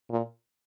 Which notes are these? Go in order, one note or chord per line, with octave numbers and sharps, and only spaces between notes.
A#2